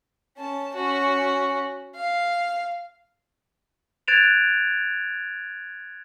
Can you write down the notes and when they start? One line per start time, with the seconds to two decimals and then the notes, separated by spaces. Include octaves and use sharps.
0.37 C#4 A5
0.75 C#4 F#4
1.95 F5
4.08 F#6 G#6 A6 D7 E7 F7